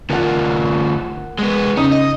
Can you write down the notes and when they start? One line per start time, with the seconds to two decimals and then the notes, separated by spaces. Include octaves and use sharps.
0.10 D2 F4 A#4 F#5
1.39 G#3 B3
1.77 C#3 D#4 D#6
1.91 D#5